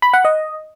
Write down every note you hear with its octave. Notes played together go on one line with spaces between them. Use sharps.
B5
F#5
D#5